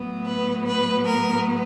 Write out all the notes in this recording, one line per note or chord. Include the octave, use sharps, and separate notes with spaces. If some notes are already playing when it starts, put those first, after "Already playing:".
Already playing: A2 F#3 B3
B4
B4
A#4